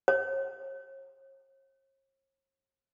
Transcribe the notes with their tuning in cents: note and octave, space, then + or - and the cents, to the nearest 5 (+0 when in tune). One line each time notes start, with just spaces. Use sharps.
C#5 -45